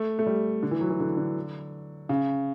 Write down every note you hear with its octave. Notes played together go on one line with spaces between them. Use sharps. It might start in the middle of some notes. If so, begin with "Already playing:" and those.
Already playing: A3
A3
G3
D3
E3
F#3
E3
D3
D3
C#3